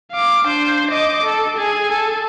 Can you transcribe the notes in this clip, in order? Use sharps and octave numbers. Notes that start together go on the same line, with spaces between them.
F5 D6
D4 C5
D#5 D6
A4
G#4 G#5
A4